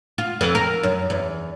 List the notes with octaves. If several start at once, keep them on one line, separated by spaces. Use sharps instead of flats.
F4
F2
A#4
F#2
E2